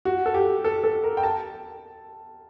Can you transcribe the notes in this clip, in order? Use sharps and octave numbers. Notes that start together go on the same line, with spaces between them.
F#4
A4
G4
A4
A4
A#4
G5
A5